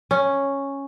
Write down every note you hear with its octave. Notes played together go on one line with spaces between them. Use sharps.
C#4